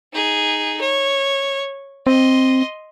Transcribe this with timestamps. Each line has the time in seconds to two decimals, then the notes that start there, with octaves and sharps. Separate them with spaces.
0.13 D#4 G#4
0.81 C#5
2.07 C4 D#5 C6